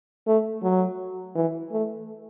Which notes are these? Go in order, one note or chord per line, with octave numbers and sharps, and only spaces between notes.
A3
F#3
E3
A3